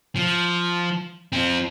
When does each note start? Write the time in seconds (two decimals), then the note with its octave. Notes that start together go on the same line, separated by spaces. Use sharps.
0.16 F3
1.32 C4 F4